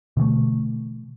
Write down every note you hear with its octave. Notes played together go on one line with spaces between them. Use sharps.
B2 D3 E3 A3